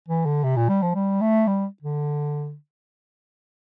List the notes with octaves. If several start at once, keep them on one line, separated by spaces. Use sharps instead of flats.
E3
D3
C3
A#2
G3
F3
G3
A3
G3
D3